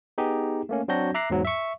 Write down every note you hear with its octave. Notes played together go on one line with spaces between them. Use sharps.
B3 D#4 G4 G#4
A3 A#3 C#4
F#3 C4 D4 F#4 G6 A#6
E5 A#5 D6 F#6 A#6 C7
E2 G#2 F#3
E5 C#6